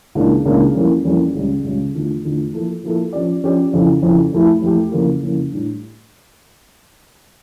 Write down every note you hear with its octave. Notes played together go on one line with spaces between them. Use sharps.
C#2 C#3 E3 A#3 D4
C#2 C#3 E3 A#3 D4
F2 E3 G3 A#3 C#4
F2 E3 G3 A#3 C#4
C#2 C#3 G3
C#2 C#3 G3
E2 D3 A3 D4 F4
E2 D3 A3 D4 F4
F3 A#3 E4 A4
F3 A#3 E4 A4
F3 C#4 G4 D5
F3 C#4 G4 D5
F2 C#3 E3
F2 C#3 E3
F2 E3 A3 E4 G4
F2 E3 A3 E4 G4
F2 C#3 E3 A#3
F2 C#3 E3 A#3
A2 G3 D4